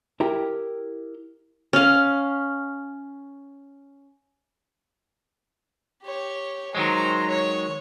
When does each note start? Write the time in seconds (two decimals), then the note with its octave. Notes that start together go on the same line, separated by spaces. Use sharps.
0.20 E4 G4 A#4 A#5
1.73 C#4 F5
6.03 G4 C#5
6.75 D#3 F#3 G#3 C5 A#5
7.28 C#5